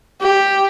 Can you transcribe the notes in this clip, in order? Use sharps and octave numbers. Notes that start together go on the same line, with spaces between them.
G4